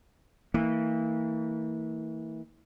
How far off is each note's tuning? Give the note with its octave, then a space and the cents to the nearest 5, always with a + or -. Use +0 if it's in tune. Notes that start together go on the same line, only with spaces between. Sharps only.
E3 -30 A#3 -35